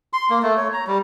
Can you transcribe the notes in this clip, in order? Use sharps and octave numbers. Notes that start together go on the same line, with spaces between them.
C6
A#3
A3
C#5
A#5
G3